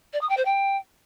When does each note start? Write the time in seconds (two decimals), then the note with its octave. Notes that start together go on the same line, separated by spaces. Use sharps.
0.13 D5
0.21 D#6
0.29 G5
0.37 C5
0.45 G5